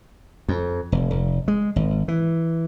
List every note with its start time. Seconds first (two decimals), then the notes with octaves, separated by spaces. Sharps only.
0.48 F2
0.92 F1
1.11 F1
1.48 G#3
1.76 G#1
2.08 E3